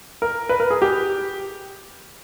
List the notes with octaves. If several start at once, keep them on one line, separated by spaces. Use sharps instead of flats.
A#4
B4
A#4
G#4
G4